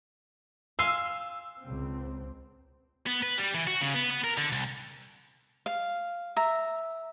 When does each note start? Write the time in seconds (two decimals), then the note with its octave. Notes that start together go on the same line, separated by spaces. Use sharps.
0.79 F5 G#5 C6 E6
1.63 C#2 C#3 C4
3.06 B3
3.23 B4
3.38 G3
3.55 E3
3.67 F#4
3.81 C#3
3.94 B3
4.11 B3
4.24 A#4
4.38 D3
4.52 C2
5.66 F5
6.36 E5 A#5